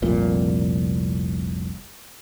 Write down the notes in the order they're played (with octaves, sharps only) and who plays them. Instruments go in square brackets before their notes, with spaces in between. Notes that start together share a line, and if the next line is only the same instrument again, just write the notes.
[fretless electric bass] F1 C2 A#2